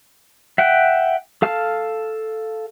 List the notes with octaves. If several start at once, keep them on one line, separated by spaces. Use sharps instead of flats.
E5 F#5 G5
A4 F5 A5 F6